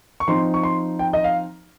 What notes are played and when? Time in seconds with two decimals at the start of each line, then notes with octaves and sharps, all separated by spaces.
0.20 C#6
0.28 F3 C4 D#4 C6
0.54 C#6
0.63 C6
0.99 G5
1.13 D#5
1.24 F5